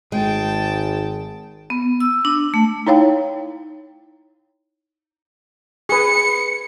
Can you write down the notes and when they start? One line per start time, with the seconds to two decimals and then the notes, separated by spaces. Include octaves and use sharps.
0.12 G#1 G#3 G5 A5
1.70 B3
2.00 E6
2.25 D4
2.54 A3
2.87 D#4 E4 C#5 F5 G5
5.89 G#4 B4 C#7